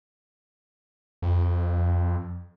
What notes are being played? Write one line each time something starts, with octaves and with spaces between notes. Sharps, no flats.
F2